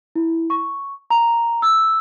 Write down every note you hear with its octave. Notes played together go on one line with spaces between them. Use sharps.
E4
C#6
A#5
E6